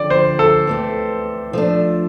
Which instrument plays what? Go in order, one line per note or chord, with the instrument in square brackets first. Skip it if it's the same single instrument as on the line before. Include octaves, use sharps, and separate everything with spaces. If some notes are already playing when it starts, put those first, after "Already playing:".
Already playing: [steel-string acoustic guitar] D3 F3 C4 [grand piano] D5
[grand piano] C5
A4
[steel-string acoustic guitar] E3 A3 C4
F3 A3 D4